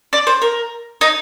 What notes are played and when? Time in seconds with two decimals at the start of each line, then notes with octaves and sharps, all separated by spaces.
0.13 D5
0.27 C5
0.42 A#4
1.01 D#4